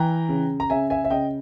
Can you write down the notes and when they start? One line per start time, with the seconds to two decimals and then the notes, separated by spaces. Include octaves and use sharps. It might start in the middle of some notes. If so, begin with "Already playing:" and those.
Already playing: E3 G5 A#5
0.29 C#3
0.60 A#5
0.70 C#3 E5 G#5
0.90 E5 G#5
1.04 E5
1.10 C#3 D#5 G5